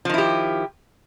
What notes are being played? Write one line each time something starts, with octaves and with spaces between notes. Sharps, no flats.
D#3 F3 E4 G4